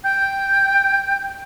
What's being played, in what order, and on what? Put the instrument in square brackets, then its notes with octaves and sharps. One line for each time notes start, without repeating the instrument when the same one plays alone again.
[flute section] G5 G6